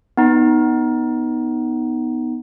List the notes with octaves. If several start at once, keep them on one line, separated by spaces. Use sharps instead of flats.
B3 D#4